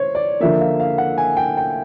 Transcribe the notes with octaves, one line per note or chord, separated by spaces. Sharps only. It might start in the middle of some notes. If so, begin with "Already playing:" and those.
Already playing: C5 C#5
D5
D3 F3 A#3 E5
F5
F5
F#5
G#5
G5
G5